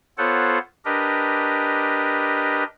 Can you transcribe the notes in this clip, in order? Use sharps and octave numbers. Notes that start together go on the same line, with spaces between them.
B3 F4 A4 C5 C#5 F#5
D4 G4 A#4 B4 D#5